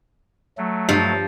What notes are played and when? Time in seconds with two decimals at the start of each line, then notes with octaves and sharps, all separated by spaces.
0.58 F#3 A3
0.89 G2 F3